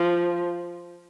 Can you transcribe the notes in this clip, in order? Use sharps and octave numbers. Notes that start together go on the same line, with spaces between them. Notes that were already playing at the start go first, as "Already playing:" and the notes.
Already playing: F3